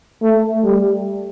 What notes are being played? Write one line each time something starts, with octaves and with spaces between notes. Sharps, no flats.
A3
G3